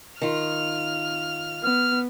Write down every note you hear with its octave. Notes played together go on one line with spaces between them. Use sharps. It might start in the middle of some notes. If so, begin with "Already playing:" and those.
D#3 F4 F6
B3 F6